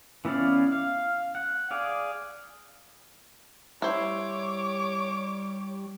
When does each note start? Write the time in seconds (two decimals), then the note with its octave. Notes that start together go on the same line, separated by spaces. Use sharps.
0.25 E3 B3 C#4 D5 F5
0.72 F5
1.35 F#5
1.71 G#4 D5 F5
3.82 G3 E4 C5 C#5 D6